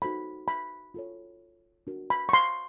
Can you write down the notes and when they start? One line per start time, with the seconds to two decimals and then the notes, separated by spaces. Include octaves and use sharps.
0.02 D#4 F#4 A4 C5 B5
0.48 B5
0.94 F4 A4 C#5
1.87 D4 F#4 A#4
2.10 B5
2.29 C#6
2.33 C6